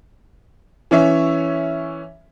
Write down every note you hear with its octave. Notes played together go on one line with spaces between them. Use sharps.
E3 C#4 C#5 E5